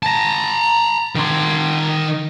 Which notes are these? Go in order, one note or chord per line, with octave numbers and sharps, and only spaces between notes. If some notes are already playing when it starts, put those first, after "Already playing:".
A5 A#5
D#3 C6